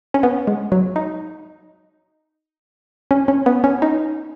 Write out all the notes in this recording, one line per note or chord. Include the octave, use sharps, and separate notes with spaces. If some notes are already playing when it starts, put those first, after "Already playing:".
C#4
B3
G#3
F#3
D#4
C#4
C#4
B3
C#4
D#4